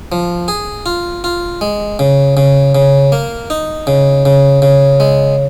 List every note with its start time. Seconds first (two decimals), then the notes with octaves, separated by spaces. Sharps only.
0.12 F3
0.48 G#4
0.86 F4
1.24 F4
1.61 G#3
1.99 C#3
2.37 C#3
2.75 C#3
3.12 A#3
3.50 D#4
3.87 C#3
4.25 C#3
4.62 C#3
5.00 G#3